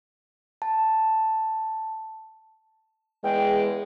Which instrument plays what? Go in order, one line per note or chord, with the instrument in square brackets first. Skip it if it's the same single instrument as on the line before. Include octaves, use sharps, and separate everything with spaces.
[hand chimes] A5
[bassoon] E2 [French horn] G#3 [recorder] G5